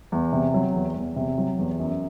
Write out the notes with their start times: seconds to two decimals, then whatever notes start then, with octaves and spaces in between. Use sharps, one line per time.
0.12 E2
0.33 C3
0.54 F#3
0.74 E2
0.96 E2
1.16 C3
1.38 F#3
1.59 E2
1.80 F#2